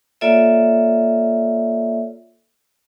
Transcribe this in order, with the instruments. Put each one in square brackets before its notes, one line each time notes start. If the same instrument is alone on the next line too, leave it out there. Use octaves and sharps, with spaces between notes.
[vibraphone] A#3 F4 A4 C#5 D5 E5